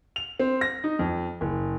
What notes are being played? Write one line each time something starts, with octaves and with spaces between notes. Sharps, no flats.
F7
C4
A#6
D#4
F2
F#1